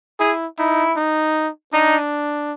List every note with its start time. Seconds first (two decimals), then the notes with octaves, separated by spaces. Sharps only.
0.20 E4 G#4
0.58 D#4 E4
0.96 D#4
1.73 D4 D#4